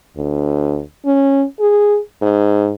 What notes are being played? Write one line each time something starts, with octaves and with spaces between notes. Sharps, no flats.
D2
C#4
G#4
G#2